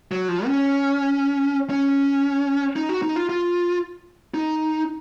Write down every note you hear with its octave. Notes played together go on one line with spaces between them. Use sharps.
F#3
F3
C#4
C#4
D#4
F#4
D#4
F4
F4
D#4